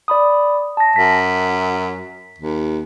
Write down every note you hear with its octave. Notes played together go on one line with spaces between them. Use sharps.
D5 B5 D#6
A5 A#6
F#2 B6
D#2